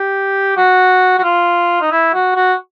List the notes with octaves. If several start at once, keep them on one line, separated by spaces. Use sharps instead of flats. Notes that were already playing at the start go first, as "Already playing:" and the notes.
Already playing: G4
F#4
F#4
F4
D#4
E4
F#4
F#4